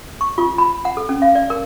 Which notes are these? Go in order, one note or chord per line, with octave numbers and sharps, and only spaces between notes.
C#6
F4
B5
F#5
A4
C#4
F5
D5
A#4